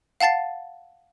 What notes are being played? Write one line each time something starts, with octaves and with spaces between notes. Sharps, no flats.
F5 F#5 A5 A6 C7